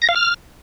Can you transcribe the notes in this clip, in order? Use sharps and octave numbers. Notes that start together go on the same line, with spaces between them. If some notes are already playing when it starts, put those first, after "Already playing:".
A#6
F5
F6